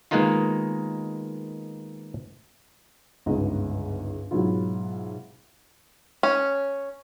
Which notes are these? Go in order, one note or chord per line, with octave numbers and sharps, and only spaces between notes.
D#3 G#3 A#3 B3 D#4 F4
G1 C#2 G#2 B3 D#5
G#2 B2 F#3 E4 F4
C#4